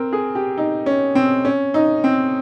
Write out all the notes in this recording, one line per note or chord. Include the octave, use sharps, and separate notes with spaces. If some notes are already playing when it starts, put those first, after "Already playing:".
Already playing: C4 A#4
G#4
G4
D#4
C#4
C4
C#4
D#4
C4